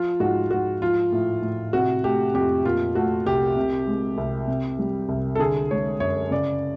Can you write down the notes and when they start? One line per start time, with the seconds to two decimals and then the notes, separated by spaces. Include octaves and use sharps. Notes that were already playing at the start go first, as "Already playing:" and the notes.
Already playing: F3 F4
0.20 G#2 F#4
0.50 G#2 F#4
0.81 F3 F4
1.12 A2
1.42 A2
1.73 C3 F#4
2.04 A3 G4
2.34 F2 G4
2.64 A#2 F4
2.95 A3 F#4
3.26 C2 G4
3.56 C3
3.87 G#3
4.18 C2
4.48 C3
4.79 G3
5.09 C2
5.35 A4
5.39 D3 G#4
5.71 G#3 C#5
6.00 F#2 C#5
6.31 C#3 D5